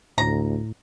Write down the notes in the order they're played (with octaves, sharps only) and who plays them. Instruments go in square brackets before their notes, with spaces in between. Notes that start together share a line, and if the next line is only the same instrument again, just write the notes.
[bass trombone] D2 [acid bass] A2 [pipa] A#5